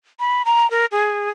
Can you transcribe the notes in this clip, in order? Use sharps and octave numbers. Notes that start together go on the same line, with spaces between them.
B5
A#5
A#4
G#4